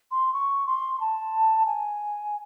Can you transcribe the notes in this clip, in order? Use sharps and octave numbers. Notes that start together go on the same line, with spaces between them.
C6
C#6
C6
A5
G#5